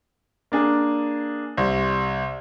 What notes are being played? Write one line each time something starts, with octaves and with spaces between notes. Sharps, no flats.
A#3 D4 G#4
C2